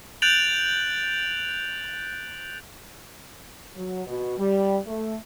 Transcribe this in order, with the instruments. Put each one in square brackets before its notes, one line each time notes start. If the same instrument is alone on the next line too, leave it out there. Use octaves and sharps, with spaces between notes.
[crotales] F#6 G6 A6 D7 F7 F#7
[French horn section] F#3
B2
G3
A3